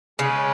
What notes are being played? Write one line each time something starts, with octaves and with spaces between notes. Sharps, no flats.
C#3 G#3 C#4 G#4 B4 D5